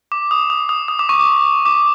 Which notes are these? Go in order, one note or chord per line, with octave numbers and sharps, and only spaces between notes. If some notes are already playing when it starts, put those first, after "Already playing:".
D6
D#6
D#6
D#6
D#6
D6
C#6
D6
D6